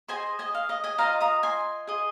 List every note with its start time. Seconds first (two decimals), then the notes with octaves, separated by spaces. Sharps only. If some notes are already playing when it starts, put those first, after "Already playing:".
0.08 G#4 C5 D#5 G#5 C6
0.39 D#5 G#5
0.54 F5
0.69 D#5
0.84 D#5 G#5
0.98 F4 C5 D#5 F5 A#5
1.21 A#5 D#6
1.43 G#5 C6
1.87 G#4 D#5